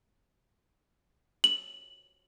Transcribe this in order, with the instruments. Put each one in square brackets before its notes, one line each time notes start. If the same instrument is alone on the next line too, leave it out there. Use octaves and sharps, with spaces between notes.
[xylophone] F#7